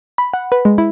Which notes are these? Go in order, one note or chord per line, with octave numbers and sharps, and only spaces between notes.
B5
F#5
B4
G#3
E4